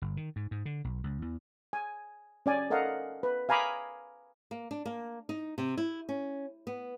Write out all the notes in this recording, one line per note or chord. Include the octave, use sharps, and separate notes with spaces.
G1
D#3
G#2
G#2
D3
B1
C#2
E2
G#5
C#4 D5 G#5
A4 A#4 D#5 F5 F#5
B4
F5 G#5 A#5 B5 D6 D#6
A#3
D4
A#3
D#4
C3
E4
C#4
B3